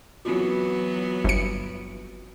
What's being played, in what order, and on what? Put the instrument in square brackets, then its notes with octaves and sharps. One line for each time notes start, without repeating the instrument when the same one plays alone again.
[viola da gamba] E3 F#3 B3 [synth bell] C4 F4 F#4
[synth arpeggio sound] G1 C#7